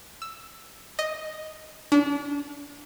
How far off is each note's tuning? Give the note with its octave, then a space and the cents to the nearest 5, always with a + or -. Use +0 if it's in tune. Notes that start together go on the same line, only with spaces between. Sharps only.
E6 +10
D#5 +0
D4 -35